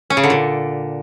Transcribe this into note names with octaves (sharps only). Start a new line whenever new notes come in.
C#4
C#3
D3
A#2